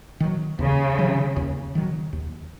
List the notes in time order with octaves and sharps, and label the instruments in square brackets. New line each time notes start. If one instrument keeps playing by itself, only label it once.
[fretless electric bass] D#3 F#3
[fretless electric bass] D#2 [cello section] C#3
[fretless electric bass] D#3 F#3
D#2
D#3 F#3
D#2